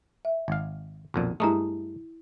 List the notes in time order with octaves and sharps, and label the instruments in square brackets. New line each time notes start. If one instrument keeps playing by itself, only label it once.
[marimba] E5
[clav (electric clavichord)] G#1 F5
B1 F2 A#2
[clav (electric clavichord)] G2 G#3 A3 [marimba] E4 A#5 D#6